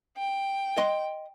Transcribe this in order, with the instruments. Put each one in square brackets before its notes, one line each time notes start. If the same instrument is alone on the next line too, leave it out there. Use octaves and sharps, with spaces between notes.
[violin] G5
[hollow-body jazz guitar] D#5 C6